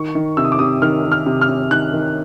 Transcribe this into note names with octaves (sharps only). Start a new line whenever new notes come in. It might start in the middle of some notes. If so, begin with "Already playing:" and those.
Already playing: D#3 C#6
D#3
C3 E6
D#6
D6
C3 D#6
D#3 F6
D#3
F6
C3
F6
C3
D#3 F#6
D#3